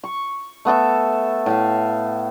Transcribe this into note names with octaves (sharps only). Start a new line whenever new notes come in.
C#6
A3 B3 A4 E5
A2 E5 F5